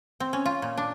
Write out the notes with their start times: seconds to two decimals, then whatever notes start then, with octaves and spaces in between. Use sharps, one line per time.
0.20 C4
0.33 C#4
0.46 F4
0.62 A#2
0.77 D4